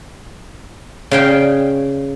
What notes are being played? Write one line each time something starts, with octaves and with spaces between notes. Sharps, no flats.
C#3 F5 G5